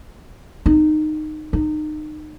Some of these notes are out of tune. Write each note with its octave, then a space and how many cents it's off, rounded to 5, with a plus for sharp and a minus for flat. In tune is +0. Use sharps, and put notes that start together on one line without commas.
D#4 -20
D#4 -30